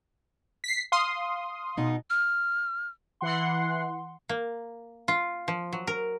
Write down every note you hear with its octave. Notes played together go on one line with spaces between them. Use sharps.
B6 C7
F5 C6 D#6
B2 D#4
F6
E3 F#5 C6
A#3
F4
F3
F#3
A#4